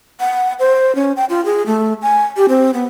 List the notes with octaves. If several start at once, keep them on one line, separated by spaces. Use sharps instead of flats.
F#5
C5
C#4
G5
F4
G#4
A3
G#5
G4
C4
B3